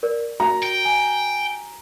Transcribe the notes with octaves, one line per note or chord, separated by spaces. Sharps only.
A#4 D5
F#4 A#5
G5
G#5